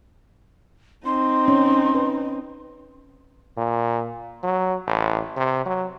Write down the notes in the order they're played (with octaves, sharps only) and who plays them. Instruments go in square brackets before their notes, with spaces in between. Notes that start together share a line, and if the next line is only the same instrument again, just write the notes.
[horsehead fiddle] C4 D#4 [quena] C6
[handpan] C#4
B4
[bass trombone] A#2
F#3
A1
C3
F#3